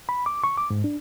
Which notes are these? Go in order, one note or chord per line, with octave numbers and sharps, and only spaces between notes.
B5
D6
C#6
D6
G#2
D4